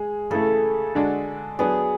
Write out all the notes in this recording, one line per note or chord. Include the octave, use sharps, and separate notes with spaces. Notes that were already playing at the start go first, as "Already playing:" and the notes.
Already playing: G#3 G#4
C#3 E3 A3 A4
D3 G#3 D4 F#4
F#3 B3 D4 G#4